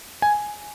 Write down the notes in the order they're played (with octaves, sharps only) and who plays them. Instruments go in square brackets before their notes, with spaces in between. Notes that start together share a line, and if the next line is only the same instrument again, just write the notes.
[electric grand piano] G#5